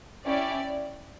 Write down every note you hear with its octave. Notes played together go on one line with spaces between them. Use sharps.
C#4 E4 G4 D5